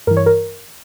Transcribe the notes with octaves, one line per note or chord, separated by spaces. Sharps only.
G2 E3 A#4
C#5
A#4